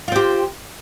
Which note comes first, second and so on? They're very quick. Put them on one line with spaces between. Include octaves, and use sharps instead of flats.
F4 C4 G4